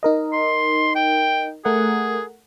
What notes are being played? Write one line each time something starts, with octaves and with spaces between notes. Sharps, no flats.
D#4 A#4 D#5
C6
G5
A3 G#4 A#4 F#5